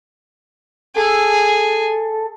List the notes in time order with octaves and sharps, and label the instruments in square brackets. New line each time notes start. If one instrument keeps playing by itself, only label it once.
[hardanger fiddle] G#4 [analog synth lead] A4